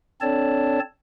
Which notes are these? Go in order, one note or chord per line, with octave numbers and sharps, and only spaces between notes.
C4 D4 A4 C#5 D5 A5